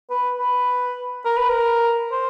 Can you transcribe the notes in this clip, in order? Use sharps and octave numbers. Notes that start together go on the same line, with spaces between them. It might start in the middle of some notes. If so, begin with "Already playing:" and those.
B4
B4
A#4
B4
A#4
C5